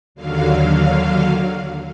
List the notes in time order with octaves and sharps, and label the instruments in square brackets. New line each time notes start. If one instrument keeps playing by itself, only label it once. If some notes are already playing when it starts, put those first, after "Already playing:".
[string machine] D#2 D3 F#3 F5